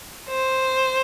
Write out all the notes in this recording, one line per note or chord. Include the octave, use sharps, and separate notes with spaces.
C5